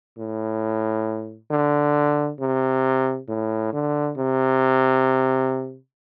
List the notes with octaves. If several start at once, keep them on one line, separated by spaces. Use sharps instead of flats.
A2
D3
C3
A2
D3
C3